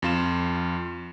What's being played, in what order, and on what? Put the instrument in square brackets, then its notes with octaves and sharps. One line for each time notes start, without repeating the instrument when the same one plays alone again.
[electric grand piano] F2 F4 E7